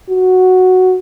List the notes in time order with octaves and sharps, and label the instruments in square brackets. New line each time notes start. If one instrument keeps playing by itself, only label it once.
[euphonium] F#4